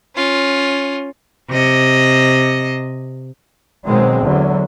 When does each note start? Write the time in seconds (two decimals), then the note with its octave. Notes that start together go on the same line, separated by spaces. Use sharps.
0.15 C#4 F4
1.50 C3 D#5
3.86 B2 D#3 F#3 G#3 C4
4.21 E2 D3 F#3